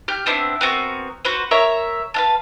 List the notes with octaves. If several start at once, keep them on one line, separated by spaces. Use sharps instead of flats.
G4 F6 G6
B3 C4 D4 E4
B3 C4 F#4 A#4
F#4 B4 C5
A#4 C#5 E5
B4 F5 A5